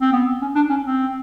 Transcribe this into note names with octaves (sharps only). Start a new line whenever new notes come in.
C4
B3
C#4
D4
C#4
C4